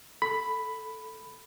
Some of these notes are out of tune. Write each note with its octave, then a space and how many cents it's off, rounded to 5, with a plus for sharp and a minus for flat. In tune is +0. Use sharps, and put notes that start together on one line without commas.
A4 +0 B5 +5